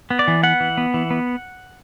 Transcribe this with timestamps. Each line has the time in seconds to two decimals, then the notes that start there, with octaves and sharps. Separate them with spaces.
0.10 B3
0.19 D5
0.28 E3
0.43 B3 F#5
0.60 E3
0.77 B3
0.94 E3
1.10 B3